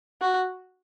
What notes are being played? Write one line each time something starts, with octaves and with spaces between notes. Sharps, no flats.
F#4